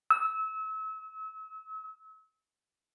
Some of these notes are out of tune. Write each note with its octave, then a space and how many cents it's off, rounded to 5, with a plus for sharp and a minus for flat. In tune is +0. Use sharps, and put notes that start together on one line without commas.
E6 -35